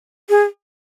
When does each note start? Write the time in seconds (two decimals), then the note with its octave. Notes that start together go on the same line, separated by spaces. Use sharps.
0.29 G#4